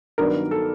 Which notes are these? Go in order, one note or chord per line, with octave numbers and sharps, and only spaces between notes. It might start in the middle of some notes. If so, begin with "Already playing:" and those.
G2 D#3 F#3 B3 D4 A#4
A4